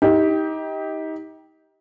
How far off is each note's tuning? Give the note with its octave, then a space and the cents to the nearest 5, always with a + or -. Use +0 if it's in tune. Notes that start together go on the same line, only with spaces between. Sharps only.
D#4 +30 G4 +0